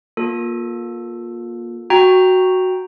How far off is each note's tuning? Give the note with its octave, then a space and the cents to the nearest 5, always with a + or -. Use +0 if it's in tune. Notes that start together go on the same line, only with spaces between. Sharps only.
A#3 +25 F4 +25 A4 +0
F#4 +0 G5 +0 A#5 +0